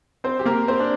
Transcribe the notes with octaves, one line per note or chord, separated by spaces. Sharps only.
C4 C5
G4
A#3 A#4
C4 C5
D4